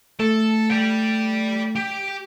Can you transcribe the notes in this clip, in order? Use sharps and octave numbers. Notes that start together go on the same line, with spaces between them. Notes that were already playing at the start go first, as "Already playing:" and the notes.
A3 A4
D5 G5
G4